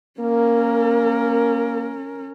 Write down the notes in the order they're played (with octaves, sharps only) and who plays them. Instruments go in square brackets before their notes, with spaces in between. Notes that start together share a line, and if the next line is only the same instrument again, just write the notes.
[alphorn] A#3 [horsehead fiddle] C#4 A#4